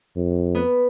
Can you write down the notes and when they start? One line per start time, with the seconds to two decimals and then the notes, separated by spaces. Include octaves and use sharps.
0.16 F2
0.55 B3